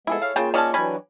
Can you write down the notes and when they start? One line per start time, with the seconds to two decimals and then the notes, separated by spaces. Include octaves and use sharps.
0.07 F3 G#3 B3 E4 G#4 A4
0.22 C#5 F5
0.36 C#3 A#3 F4 G#4 G5 A5
0.54 D#3 C#4 D#4 C#5 D5 A5
0.74 E3 F#3 G3 D4 G#5 B5